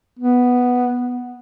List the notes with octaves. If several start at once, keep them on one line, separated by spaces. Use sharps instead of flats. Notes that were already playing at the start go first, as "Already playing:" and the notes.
B3